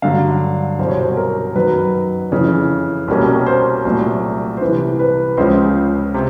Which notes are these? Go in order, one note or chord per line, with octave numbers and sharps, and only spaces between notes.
G2 D3 F#3 F5
C2 B2 F#3 C5
C#5
C5
A#4
F#2 D#3 F#3 B4
F2 C#3 E3
C2 B2 G3 A#3 C#4
C5
C2 A#2 F#3 A3
C5
C2 C3 E3 B4
B4
C#2 C#3 F3 C5
C3